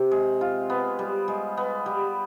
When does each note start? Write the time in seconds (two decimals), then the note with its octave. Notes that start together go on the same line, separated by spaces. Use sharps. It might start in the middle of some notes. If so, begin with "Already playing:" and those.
Already playing: C3 C4
0.11 G#3
0.41 F4
0.70 B3
0.99 G3
1.28 G#3
1.57 B3
1.86 G3